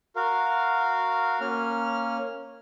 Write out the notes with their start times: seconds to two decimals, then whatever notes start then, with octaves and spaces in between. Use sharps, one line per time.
0.16 F#4 A#4 F5
1.41 A#3 C#4 F6